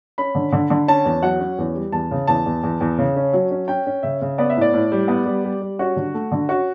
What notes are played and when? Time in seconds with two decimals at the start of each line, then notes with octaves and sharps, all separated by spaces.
0.18 C#4 B5
0.35 D3
0.52 D3
0.70 D3
0.88 C#4 A5
1.05 E2
1.22 F#3 F#5
1.40 C#4
1.58 E2
1.75 G3
1.92 E2 A5
2.11 C#3
2.28 E2 A5
2.46 E2
2.63 E2
2.80 E2
2.99 C#3
3.16 C#4
3.33 F#3
3.51 C#4
3.68 C#4 G5
3.87 C#4
4.03 C#3 E5
4.22 C#3
4.38 B3 D5
4.50 E5
4.57 A2 D5
4.73 A2
4.92 G3
5.08 B3
5.26 G3
5.44 G3
5.61 G3
5.79 C#4 F#4
5.96 D3
6.14 A3
6.32 D3
6.49 C#4 F#4